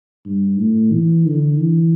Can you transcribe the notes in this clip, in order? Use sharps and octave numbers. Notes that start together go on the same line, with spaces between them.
G2
A2
E3
D3
E3